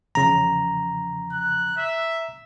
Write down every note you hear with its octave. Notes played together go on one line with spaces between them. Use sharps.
E2 C#3 F3 A#5
F#6
E5